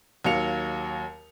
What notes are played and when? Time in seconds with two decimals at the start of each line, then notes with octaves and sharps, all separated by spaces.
0.25 D#2 F#3 F5 C#7 F7